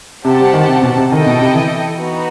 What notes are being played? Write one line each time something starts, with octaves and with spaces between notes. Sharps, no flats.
C3 G4 C5 F#5 A5
G3
D#3
C3
B2
C3
D#3 E4 A4 D#5 G5
B2
C3
E3
B3 D#4 F#4